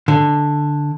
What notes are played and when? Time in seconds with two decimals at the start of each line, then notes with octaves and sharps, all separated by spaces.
0.08 D3